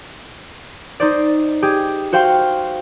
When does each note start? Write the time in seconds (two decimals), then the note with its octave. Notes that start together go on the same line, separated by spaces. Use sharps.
1.00 D#4 C5 D5
1.62 G4 G#4
2.13 F#4 C5 F5 G5 C6